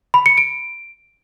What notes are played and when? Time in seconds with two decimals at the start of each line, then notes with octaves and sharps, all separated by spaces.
0.14 B5
0.26 C#7
0.38 D7